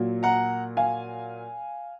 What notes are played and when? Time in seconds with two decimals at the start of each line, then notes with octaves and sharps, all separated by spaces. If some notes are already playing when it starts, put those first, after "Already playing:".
Already playing: A#2 F#3
0.23 F#5 A#5
0.77 F5 G#5